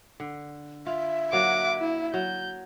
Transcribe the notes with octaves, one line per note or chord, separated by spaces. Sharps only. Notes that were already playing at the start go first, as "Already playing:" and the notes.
D3
F4 E5
F#3 A#3 D5 F#5 D6
E4
F#3 G6